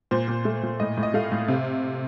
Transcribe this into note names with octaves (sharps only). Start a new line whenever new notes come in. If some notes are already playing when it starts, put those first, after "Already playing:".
A#2 C5
A#2
A3
A#2
A2 D#5
A2
D#5
A3 F5
A2
C3